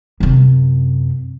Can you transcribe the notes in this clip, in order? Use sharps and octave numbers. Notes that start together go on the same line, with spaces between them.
F#2 C3